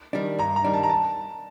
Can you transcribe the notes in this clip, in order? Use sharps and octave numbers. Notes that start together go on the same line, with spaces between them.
D#3 G3 D4
G2 A#5
A#5
D#3 G3 D4
A5
A#5
A5